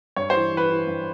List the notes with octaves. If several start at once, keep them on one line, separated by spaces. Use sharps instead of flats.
G2 C#5
C5
E3
E3 B4
E3
G2